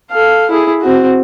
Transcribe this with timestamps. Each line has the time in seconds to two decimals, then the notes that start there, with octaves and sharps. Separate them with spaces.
0.11 A4 F5
0.50 E4 G#4
0.81 C4 F#4